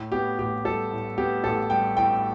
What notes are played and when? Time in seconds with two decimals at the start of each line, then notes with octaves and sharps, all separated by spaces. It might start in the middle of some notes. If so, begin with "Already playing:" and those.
Already playing: A2
0.12 B3 G4
0.39 A1 G4
0.65 G3 A4
0.91 A2
1.18 B3 G4
1.44 A1 A4
1.70 G3 G5
1.97 A2 G5